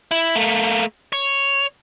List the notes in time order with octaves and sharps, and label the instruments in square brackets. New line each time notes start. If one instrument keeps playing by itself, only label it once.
[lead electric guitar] E4
A3 A#3
C#5